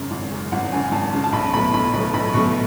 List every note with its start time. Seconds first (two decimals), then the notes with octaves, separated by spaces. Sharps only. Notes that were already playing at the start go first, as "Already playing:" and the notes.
Already playing: G#1 F#2 C#3
0.11 G#1
0.31 F#2 C#3
0.52 G#1 F#5
0.72 F#2 C#3 G#5
0.92 G#1 A5
1.12 F#2 C#3
1.24 A5
1.33 B1 B5
1.54 B2 A3 B5
1.74 B1 B5
1.94 B2 A3 B5
2.13 B1 B5
2.34 B2 A3 C#6